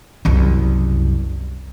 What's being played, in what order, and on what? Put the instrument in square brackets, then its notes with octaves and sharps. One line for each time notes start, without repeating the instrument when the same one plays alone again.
[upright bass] F#1 C2